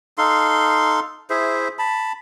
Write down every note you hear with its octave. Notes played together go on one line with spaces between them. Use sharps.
D#4 A4 F5 C6
E4 G#4 C5 E5
A5 B5